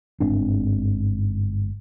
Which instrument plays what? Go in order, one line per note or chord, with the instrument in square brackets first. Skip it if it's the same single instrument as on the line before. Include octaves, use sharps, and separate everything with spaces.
[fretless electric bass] G1 G#2 C4 D4